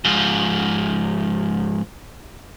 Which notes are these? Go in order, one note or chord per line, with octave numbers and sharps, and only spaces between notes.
G#2 F3